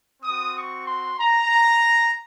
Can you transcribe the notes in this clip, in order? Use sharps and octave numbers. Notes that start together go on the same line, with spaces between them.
C4 F#4 D#6
C#6
C6
A#5